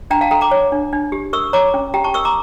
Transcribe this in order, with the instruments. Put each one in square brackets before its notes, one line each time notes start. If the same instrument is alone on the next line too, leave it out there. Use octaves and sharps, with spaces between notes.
[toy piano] D4 G5 A#5
F5 A5
A4 G5 A#5
A#5 D6
C#5
D4
D4
G4
A#4 C#6 E6
C#5 A#5 D6
C#4
G4 G5 A#5
A5 C#6
A#4 C#6 E6
A#5 D6